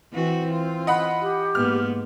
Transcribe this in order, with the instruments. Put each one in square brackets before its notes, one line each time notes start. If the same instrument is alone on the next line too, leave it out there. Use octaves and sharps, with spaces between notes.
[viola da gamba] E3 F#4 [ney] C4
[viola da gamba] F4
[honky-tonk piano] D#5 F#5 B5
[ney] G4
[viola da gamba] G#2 A#3 B3 [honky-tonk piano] F6